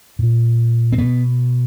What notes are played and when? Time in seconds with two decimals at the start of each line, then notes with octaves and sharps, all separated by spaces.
0.19 A#2
0.92 C4
0.98 B2 B3